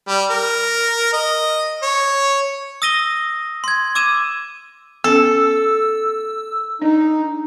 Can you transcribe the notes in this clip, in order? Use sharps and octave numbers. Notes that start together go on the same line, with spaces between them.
G3
A#4
D#5
C#5
D#6 E6 A#6 D#7 G7
C6 G#6
D6 E6 G#6 D#7 E7
B3 C#4 A4 E6
D4 D#4